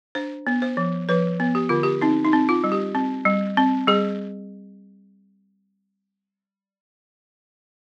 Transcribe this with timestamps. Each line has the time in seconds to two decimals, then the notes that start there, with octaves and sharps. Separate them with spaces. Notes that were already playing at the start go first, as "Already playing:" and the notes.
0.15 D4 C5
0.47 B3
0.62 C5
0.77 F3
1.09 F3 B4
1.40 B3
1.55 G4
1.69 D3 F4
1.83 G4
2.01 C4 D#4
2.25 D#4
2.33 C4
2.49 F4
2.64 G3
2.72 G4
2.95 C4
3.25 G3
3.57 C4
3.87 G3 G#4